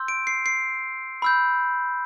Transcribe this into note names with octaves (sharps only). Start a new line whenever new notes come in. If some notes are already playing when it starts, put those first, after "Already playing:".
Already playing: C6 E6 G6
D7
C7
C7
B5 E6 G6